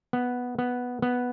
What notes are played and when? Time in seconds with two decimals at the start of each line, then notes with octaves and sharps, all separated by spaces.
0.13 B3
0.59 B3
1.02 B3